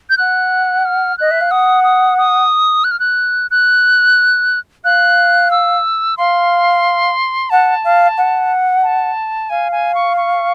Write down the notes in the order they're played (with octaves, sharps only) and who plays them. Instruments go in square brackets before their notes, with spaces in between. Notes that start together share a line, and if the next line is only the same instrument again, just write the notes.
[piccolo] G6
[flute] F#5 [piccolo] F#6
[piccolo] F6
[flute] D#5 [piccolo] F#6
[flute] E5
F5
[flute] F#5 [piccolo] D#6
[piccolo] D#6
D#6
F#6
F6
F#6
F#6
[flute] F5 [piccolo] F#6
[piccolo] E6
[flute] F5 [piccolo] C6
[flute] F#5 [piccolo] A5
[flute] F5
F#5
[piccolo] A5
[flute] F5 [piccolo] G#5
[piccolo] G#5
C#6
C#6